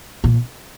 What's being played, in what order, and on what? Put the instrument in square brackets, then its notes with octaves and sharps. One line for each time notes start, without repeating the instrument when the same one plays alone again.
[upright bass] A#2